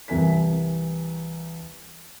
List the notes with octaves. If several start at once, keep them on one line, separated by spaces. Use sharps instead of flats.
C2 E3 A#4 G#5 B6